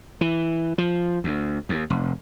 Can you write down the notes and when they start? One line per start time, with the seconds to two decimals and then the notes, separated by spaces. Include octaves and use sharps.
0.21 E3
0.78 F3
1.24 D2
1.69 D#2
1.90 F1